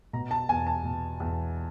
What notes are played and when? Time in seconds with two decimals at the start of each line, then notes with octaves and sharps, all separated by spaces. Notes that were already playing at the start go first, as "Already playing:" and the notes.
0.13 B2 A#5
0.31 A5
0.49 E2 G#5
0.67 A5
0.84 B2
1.20 E2